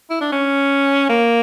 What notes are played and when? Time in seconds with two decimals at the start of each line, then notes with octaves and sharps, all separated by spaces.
0.10 E4
0.21 D4
0.32 C#4
1.09 A#3